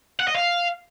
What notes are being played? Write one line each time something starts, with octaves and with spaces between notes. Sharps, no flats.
F#5
D#5
F5